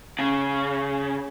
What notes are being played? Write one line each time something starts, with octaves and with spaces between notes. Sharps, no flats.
C#3